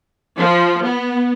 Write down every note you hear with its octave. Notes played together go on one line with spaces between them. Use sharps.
F3
B3